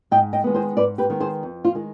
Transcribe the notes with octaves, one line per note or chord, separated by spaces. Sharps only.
G#2 D#5 G5
D#5 G5
D#3 G#3 B3
G#4 C5
G#2 B4 D5
G4 B4
D#3 G#3 B3
G#4 C5
F2
F4
D#3 G#3